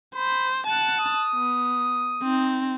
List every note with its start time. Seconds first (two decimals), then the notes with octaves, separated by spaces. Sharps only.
0.15 C5 B5
0.67 F#5 A5 F#6
1.00 D#6
1.35 B3
2.22 C4 D#4